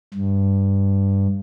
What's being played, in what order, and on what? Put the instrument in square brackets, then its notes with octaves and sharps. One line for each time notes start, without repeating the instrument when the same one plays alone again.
[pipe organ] G2